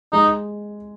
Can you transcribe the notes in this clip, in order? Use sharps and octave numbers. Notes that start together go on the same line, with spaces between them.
G#3 D#4